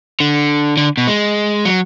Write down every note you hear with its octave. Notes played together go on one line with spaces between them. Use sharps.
D3
D3
B2
G#3
F#3